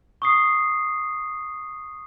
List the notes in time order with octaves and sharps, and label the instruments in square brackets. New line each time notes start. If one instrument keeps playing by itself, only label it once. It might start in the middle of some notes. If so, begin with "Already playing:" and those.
[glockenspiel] C#6 D#6 C7